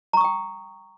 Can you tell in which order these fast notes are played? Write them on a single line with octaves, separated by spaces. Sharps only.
A#5 C#6 D#6 G5